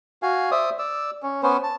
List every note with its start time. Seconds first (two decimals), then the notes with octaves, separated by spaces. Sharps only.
0.22 F#4 F5 G#5
0.51 C5 D5 E5 D#6
0.79 D5 E6
1.23 C#4
1.43 B3 C#4 C5
1.63 A5